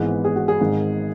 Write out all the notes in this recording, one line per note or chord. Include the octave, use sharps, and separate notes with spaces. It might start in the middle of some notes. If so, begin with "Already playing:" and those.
Already playing: G#1 G#2 E3 G#3 B3 B4
G#4
F#4
G#4
G#1 G#2 D#3